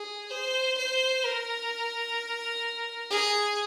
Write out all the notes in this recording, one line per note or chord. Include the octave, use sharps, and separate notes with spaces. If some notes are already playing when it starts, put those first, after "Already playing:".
Already playing: G#4
C5
C5
A#4
G#4